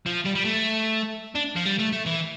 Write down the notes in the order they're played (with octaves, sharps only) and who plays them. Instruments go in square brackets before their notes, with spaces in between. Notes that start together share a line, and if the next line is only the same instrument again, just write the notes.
[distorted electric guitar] F3
G3
G3
A3
D4
F3
G3
A3
A3
E3